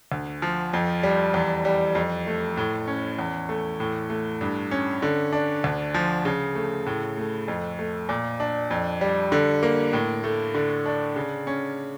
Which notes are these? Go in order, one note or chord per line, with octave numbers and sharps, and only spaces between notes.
D2
F3
F2
G3
E2
G3
F2
A3
A2
C#4
E2
A3
A2
A3
G2
C#4
D3
D4
D2
F3
C#3
A3
A2
A3
F2
A3
A#2
D4
F2
G3
D3
A#3
A2
A3
D3
D4
C#3
C#4